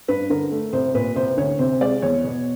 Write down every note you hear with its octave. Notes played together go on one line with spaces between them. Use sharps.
G2 B4
D3 A#4
A3
C2 C5
A#2 B4
C2 C5
D2 C#5
C3 C5
G#3 D5
E2 C#5
B2